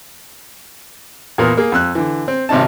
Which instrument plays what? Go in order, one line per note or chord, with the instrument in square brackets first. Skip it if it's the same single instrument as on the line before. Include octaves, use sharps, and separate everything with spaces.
[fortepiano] E2 A#2 A#4 B4 D#6
A#3 G#4
F2 E6 F#6
D3 E3
C4
G#1 C3 C#4 D#4 A5